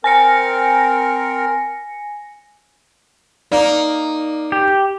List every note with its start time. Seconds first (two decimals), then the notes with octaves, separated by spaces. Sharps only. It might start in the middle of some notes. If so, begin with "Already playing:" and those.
0.04 C4 A#4 G#5 A#6 C#7
3.52 A#3 D#4 D5
4.52 G4